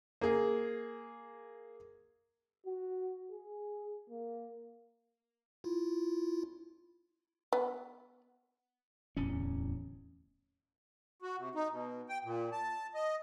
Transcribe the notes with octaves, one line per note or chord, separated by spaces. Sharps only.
A#3 G#4
F#4
G#4
A#3
E4 F4
B3
D1 E2 C#4
F#4
C3
D#4
B2
G5
A#2
A5
D#5